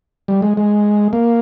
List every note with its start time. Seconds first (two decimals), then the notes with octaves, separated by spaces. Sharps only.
0.28 G3
0.42 G#3
0.57 G#3
1.13 A#3